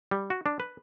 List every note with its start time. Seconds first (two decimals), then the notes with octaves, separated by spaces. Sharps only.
0.11 G3
0.30 F#4
0.46 D4
0.60 B4